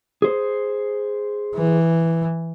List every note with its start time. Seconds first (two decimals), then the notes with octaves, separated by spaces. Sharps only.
0.22 G#4 C5
1.55 E3